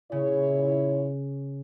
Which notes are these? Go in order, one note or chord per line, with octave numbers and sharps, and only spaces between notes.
A#2 C#3 E4 C#5